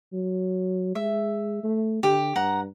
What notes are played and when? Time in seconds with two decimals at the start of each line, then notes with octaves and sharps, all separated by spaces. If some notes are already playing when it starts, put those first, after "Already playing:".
0.13 F#3
0.95 G#3 E5
1.64 A3
2.03 D3 G4
2.36 G2 F#5 A#5